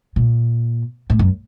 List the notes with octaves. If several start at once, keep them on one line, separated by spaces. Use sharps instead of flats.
A#2
A2
F#2